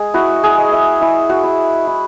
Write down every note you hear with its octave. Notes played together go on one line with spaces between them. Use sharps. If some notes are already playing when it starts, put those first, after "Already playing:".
Already playing: G#3 G#4
E4 F#4
G#4
G#3
E5
E4
F#4
E4
E4